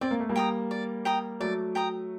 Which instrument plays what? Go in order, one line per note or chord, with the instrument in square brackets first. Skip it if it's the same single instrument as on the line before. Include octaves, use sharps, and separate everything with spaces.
[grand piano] C4 [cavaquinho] D5
[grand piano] A#3
A3
G3 A#3
[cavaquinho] G5 A#5 D#6
D5
G5 A#5 D#6
[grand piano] F#3 A3 [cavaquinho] D5
[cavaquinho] G5 A#5 D#6